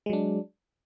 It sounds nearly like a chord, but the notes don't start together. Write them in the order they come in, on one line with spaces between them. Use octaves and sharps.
G#3 F#3 D4